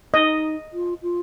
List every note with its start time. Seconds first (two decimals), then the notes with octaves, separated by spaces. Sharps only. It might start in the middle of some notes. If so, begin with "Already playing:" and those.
0.14 D#4 D#5
0.73 F4
1.03 F4